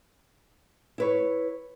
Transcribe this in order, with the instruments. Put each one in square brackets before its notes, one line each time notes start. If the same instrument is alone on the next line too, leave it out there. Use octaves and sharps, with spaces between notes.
[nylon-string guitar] E4 B4 C#5